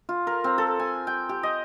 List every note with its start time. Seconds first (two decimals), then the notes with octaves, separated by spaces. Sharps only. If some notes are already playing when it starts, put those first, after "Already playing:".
0.09 F4
0.27 A#4
0.44 C4
0.58 A4
0.79 G#5
1.07 G5
1.29 G4
1.43 D#5